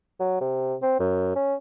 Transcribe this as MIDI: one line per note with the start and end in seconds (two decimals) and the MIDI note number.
0.19 0.37 54
0.41 0.75 48
0.82 0.95 60
1.00 1.31 42
1.36 1.54 61